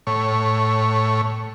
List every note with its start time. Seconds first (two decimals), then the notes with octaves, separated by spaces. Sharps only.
0.07 A2 C#5